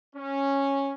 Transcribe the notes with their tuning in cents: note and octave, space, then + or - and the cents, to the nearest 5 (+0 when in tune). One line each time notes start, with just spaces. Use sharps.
C#4 -10